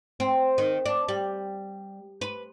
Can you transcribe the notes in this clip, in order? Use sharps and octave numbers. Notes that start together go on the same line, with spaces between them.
C4
D#3
D4
G3
B4